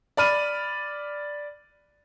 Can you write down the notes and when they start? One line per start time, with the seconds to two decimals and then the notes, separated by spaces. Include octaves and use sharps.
0.17 D5 B5 F6 D#7